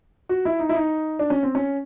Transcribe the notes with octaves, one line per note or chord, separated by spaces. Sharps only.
F#4
E4
D#4
E4
D#4
D4
C#4
C4
C#4